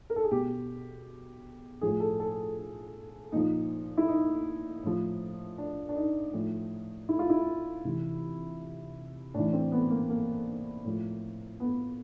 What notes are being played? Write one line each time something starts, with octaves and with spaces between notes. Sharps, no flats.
A#4
A4
G#4
B2 G4
A2 F3 G#4
A4
A4
A#2 F3 D#4
E4
D#4
A2 F3
D4
D4
D#4
A2 F3
E4
F4
E4
C3 E3
A2 E3 D4
C4
B3
A#3
A#3
A2 F3
B3